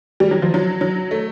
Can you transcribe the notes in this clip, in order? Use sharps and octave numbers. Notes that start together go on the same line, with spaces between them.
G3
F#3
F3
F#3
F#3
A3